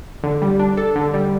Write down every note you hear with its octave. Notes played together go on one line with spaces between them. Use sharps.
D3
G3
D4
A4
D3
G3